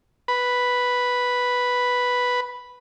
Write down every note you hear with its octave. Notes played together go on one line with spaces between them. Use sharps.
B4 B5